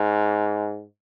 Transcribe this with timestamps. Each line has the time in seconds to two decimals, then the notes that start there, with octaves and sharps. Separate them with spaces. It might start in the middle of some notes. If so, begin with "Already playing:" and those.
Already playing: G#2